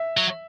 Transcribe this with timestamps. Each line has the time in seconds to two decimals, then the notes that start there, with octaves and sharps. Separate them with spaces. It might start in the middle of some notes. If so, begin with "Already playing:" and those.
Already playing: E5
0.17 F#3